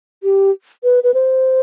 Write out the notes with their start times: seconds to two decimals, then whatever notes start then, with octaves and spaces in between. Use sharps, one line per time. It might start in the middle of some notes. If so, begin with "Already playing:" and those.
0.23 G4
0.84 B4
1.04 B4
1.14 C5